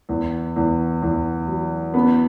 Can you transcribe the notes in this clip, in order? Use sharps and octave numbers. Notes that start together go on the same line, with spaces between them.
E2
E2
E2
F#3
B3